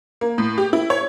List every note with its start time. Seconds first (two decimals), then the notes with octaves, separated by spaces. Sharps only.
0.21 A#3
0.38 A2
0.58 G4
0.73 E4
0.90 C#5